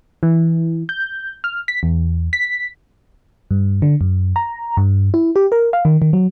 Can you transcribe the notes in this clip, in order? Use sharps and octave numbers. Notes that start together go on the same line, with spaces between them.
E3
G6
F6
B6
E2
B6
G2
D3
F#2
A#5
G2
E4
G4
A#4
F5
D#3
D#3
F#3